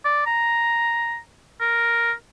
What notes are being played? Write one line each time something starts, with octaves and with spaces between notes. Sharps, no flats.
D5
A#5
A#4